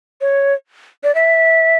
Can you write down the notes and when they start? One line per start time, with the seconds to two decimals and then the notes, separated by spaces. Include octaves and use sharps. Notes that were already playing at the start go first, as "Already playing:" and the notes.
0.21 C#5
1.03 D5
1.15 E5